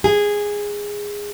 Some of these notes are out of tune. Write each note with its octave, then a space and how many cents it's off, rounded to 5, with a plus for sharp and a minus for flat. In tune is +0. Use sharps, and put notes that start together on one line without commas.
G#4 -10